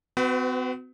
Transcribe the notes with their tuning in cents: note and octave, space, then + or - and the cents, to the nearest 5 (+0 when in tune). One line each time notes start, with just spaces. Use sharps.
C4 -45 F#4 +0 B4 +25